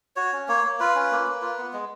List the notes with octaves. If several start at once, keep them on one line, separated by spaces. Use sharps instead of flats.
F#4 C#5
C#4
A#3 C#5
A#3
F4 B4
C#4
A#3
A#3
F4
B3
G#3